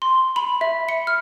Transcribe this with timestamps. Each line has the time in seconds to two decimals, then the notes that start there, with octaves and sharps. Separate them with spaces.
0.02 C6
0.36 B5
0.61 E5
0.89 C#7
1.07 F6